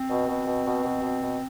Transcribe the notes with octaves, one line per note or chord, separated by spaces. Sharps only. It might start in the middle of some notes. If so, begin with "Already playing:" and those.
Already playing: C4
B2
B2
B2
B2
B2
B2
B2